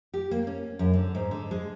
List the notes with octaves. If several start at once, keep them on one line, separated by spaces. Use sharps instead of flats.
G4
A#3
C#4
F#2
D3
G#2
D3
G#3